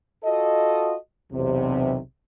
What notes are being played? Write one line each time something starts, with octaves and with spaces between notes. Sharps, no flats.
F4 F#4 A4 D#5
B1 E2 C3